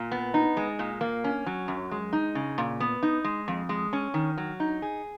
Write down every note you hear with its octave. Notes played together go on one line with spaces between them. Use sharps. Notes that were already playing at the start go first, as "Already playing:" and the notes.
Already playing: A#2
B3
D#4
G#3
A#2
A#3
C#4
F#3
F#2
G#3
D#4
C#3
A#2
B3
D#4
G#3
F2
G#3
C#4
D#3
F#3
D#4
G#4